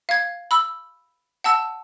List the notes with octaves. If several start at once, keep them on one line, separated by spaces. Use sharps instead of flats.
F5 G#6
B5 E6
F#5 A5 E6